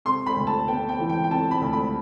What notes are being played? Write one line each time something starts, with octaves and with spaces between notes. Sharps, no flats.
C3 C6
B5
D2
A5
B3 G5
G5
E3
G5
G5
C3 A5
B5
D2
B5